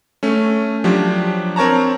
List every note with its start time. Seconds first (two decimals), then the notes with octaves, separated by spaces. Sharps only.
0.23 A3 C#4
0.84 F3 F#3 D4 G4
1.56 C4 A#4 C#5 A5 A#5